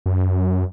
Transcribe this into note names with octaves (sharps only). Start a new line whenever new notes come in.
F#2